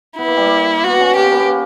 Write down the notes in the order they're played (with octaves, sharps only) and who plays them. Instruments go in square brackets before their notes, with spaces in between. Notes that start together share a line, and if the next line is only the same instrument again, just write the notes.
[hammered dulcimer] B3 [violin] E4
[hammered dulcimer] A#3
G3
A#3
[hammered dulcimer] B3 [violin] F#4
[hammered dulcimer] C#4
[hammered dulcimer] A#3 [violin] G4
[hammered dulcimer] B3
A#3
B3
A#3